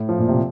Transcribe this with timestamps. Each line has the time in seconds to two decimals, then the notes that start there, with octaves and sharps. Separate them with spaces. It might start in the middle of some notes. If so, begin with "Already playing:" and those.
Already playing: A2
0.09 F3
0.19 A#2
0.28 C3